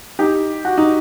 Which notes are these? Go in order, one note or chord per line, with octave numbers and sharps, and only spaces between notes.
D#4 G4
F#4
D#4